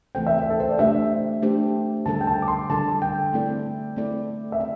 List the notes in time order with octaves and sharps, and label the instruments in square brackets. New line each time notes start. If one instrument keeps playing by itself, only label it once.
[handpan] E3 A3 C4 A4 C5 [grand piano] G5
[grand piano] E5
G5
A4
C5
D5
[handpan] A3 D4 G4 C5 [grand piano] E5
[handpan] A3 D4 G4 C5
[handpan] D3 G3 D4 A4 [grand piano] A5
[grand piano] G5
A5
D6
C6
[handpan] D3 G3 D4 A4 [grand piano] A5
[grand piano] G5
[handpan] A3 C4 E4 A4 D5
A3 C4 E4 A4 D5
[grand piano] E5
[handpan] C4